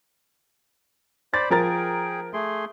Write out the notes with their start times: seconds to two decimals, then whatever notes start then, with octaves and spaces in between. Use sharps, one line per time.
1.34 C5 D5 B5 A6
1.50 F3 G#4 A#4 G5 A6
2.33 A3 G#4 C6